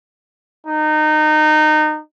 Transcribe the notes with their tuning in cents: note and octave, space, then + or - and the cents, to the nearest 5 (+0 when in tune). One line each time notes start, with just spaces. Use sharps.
D#4 -20